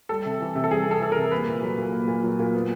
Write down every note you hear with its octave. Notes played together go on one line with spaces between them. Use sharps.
G3 A4
C3
E3
C3
A4
G3 G#4
C3 A4
E3 A4
A#4
C3
A#3 B4
A#2
F#3
A#2
A#3
A#2
F#3
A#2
B3